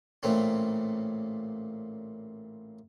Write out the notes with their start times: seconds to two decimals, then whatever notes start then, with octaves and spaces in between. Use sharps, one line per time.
0.23 A1 A#2 A3 C4 C#4